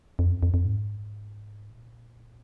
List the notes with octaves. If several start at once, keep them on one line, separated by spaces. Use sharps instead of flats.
F2
F#2
F2
F2
G#2
A#2